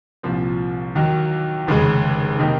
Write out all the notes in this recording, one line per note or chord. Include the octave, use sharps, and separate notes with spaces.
C2 A#2 F3 C4
D#2 D#3 F#3
F1 D#2 C#3 G#3
C3 D#3 A#3 D#4